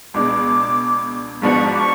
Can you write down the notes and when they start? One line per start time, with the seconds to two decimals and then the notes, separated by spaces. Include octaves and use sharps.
0.14 C#2 B2 G#3 D4 D6
1.42 G#2 F3 B3 D4 F#4 C#6
1.73 D6
1.78 C#6